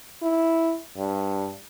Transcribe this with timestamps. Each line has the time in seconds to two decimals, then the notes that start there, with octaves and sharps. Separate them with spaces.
0.22 E4
0.98 G2